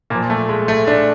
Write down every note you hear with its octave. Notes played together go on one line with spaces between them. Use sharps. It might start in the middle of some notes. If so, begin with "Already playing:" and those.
A#2 F3 A#3
A3
G#3
A3
D4